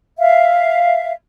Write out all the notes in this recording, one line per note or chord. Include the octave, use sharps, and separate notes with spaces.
E5 F5